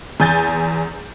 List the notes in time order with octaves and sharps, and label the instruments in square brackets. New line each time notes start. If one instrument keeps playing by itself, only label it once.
[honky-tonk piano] E2 G#5 G6 A6